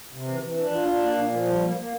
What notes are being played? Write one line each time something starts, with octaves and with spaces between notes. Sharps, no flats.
C3
E3
E3
D4
F4
D4
A#3
A#2
F3
G3
A#3
A#3